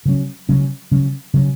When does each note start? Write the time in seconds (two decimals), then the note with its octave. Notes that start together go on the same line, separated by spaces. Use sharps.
0.05 C#3 F#3 C#4
0.49 C#3 F#3 C#4
0.91 C#3 F#3 C#4
1.34 C#3 F#3 C#4